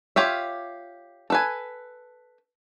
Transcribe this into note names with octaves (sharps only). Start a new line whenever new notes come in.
F4 G4 C#5 E5
A4 B4 G#5